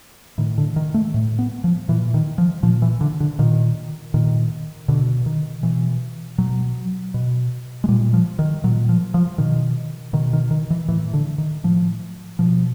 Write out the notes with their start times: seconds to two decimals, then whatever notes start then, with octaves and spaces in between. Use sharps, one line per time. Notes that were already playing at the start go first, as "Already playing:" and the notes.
0.38 A2 D#3
0.58 D3
0.76 D#3
0.94 A3
1.14 A2
1.39 B3
1.64 F3
1.88 A#2 E3
2.14 D#3
2.38 F3
2.63 A#2 F3
2.82 E3
3.01 D3
3.20 D3
3.39 A#2 D#3
4.14 A#2 D#3
4.88 B2 D3
5.26 D#3
5.63 B2 E3
6.38 B2 F#3
7.14 B2
7.84 G#3
7.88 A#2 G3
8.14 F3
8.39 D#3
8.64 A#2 F#3
8.89 F3
9.14 F3
9.38 B2 D#3
10.13 B2 D#3
10.33 D#3
10.51 D#3
10.70 E3
10.88 A2 E3
11.13 D3
11.38 D#3
11.64 A2 F3
12.39 B2 F3